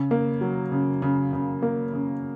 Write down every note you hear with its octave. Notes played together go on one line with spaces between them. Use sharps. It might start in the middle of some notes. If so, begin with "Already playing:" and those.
Already playing: C#3
A#3
F#3
C#3
C#3
C#3
A#3
C#3